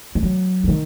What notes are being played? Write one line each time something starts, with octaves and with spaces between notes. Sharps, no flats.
G#3
F#3
C#3
D#3